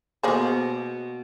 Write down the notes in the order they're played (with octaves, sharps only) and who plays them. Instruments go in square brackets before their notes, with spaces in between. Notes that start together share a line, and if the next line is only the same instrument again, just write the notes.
[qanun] B2 C#6 [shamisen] A#3 G#4 C5